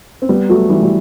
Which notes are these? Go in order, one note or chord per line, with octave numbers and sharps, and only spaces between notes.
C4
G3 B3
F#3 A3
E3 G3
G3